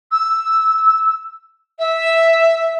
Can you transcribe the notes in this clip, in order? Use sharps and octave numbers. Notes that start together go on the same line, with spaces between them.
E6
E5